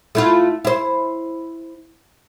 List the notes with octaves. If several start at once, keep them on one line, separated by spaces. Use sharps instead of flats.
A3 E4 F4
E4 C5